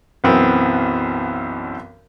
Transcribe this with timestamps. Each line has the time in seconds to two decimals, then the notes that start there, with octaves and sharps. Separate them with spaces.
0.24 B1 F#2 E3 B3 C4